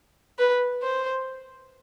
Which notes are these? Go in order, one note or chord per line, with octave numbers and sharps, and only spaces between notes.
B4
C5